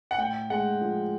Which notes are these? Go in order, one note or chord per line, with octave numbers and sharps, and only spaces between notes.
F#5
A2 G5
G#3 F#5
F3